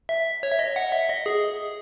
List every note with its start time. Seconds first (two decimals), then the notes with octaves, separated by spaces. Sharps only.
0.09 E5
0.43 C#5
0.51 E5
0.59 D#5
0.76 F#5
0.92 E5
1.09 D#5
1.26 G#4